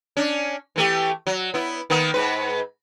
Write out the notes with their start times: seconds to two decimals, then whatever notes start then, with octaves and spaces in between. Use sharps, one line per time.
0.17 C#4 D4
0.76 E3 A3 G4
1.27 F#3
1.54 B3 E4
1.90 D#3 A#3 B3
2.14 G#2 B4